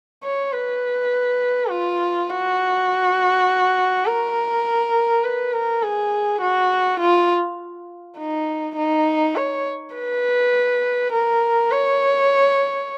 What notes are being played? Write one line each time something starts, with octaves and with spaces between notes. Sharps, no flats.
C#5
B4
F4
F#4
A#4
B4
A#4
G#4
F#4
F4
D#4
D#4
C#5
B4
A#4
C#5